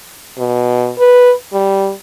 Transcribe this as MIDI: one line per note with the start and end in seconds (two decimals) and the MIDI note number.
0.38 0.91 47
0.99 1.33 71
1.53 1.92 55